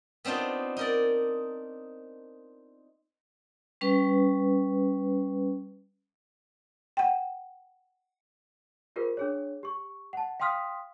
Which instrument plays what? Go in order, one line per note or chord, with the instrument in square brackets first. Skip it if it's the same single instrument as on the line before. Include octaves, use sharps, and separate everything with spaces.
[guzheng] B3 C4 D4 D#4 F4
D#4 A#4 D5
[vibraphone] G3 C#4 B4
[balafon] F#5 G5
[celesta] F4 G4 G#4 A#4 C5
D4 G#4 C#5
G4 C#6
F#5 A5
F5 G5 C6 D#6 F6 B6